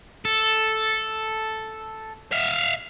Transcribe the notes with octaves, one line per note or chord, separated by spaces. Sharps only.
A4
E5 F5